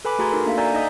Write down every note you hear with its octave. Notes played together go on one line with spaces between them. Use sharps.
A4 B4 G#5 B5 D6
A3 F#4 G#4 A#5 C6 G#6
D#4 F#4 A4 A#4
A#3 D4 A4 E5 F5
D5 G#5 A#5 E6 G6 G#6
D#4 D#5 E5 D#6 G6